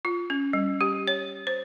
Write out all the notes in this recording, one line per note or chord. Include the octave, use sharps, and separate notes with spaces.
F4
C#4
G3
G4
C#5
C5